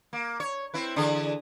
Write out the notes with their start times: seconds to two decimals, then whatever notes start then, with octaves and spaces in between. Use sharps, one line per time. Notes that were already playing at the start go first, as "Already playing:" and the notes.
0.13 A#3
0.40 C#5
0.74 C4 E4 B4
0.96 D3 E3 G#4